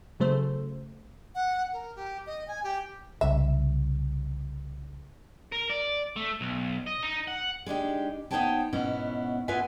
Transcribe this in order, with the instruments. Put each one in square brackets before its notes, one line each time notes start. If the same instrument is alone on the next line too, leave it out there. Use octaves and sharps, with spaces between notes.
[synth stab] C#3 F#3 A3 C5
[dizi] F#5
A#4
G4
D#5
G#5
G4
[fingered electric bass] C2 C#3 [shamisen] E5
[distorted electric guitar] A#4
D5
A3
B1
D#5
D#4
F#5
[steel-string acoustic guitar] G#3 D4 D#4 G4
B3 D#4 C5 C#5 G5 A5
G#2 B2 B3 C#4 E4
B3 E4 F4 B4 E5 G#5